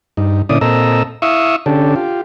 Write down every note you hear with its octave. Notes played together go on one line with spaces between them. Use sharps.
G2 D#4
A#2 D3 C#4 E4 D5 D#6
A#2 C4 A4 D#5 A#5 E6
E4 E5 F5 C#6 D#6 E6
D3 C#4 D4 G4 A4
F4 G4